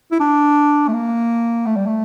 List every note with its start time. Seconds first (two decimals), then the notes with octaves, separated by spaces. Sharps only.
0.12 E4
0.20 D4
0.88 A3
0.93 A#3
1.66 A3
1.76 G3
1.86 A3